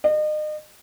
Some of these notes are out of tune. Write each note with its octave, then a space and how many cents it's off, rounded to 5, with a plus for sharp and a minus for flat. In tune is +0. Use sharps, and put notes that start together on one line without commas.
D#5 -35